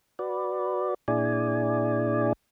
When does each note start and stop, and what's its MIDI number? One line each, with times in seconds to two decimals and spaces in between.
0.19 0.94 66
0.19 0.94 71
0.19 0.94 74
1.08 2.33 46
1.08 2.33 62
1.08 2.33 64
1.08 2.33 68
1.08 2.33 74
1.08 2.33 80